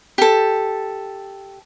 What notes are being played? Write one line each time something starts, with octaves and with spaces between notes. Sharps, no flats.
G4 A4